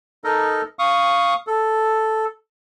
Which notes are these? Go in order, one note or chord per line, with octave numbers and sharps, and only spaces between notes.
D#4 A4 A#4 D#5
F5 C#6 D#6
A4